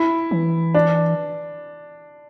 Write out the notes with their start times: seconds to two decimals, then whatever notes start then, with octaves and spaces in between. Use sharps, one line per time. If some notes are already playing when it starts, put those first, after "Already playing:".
Already playing: E4
0.31 E3
0.74 D4